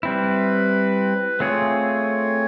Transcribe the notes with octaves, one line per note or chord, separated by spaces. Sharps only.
G3 C4 E4 B4
A3 C4 F4 G#4 C#5